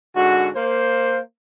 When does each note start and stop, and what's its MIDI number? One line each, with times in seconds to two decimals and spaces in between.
0.16 0.50 44
0.16 0.50 50
0.16 0.50 66
0.56 1.20 58
0.56 1.20 72